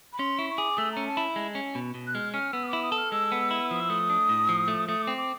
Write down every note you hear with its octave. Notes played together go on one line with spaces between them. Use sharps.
B5
C#4 C6
E4 C#6
C#6
G#4 D6
A3 E6
C#4 A#5
A5
E4
G#3
C#4
B2
B2
F#6
G#3 F6
C#4 F6
B3 E6
D#6
D6
E4
D#6
A4
F6
G#3 E6
B3
E4
F3 D#6
E6
A3 D#6
D4
A2
F3
A3
A3 D#6
C4 D6
D6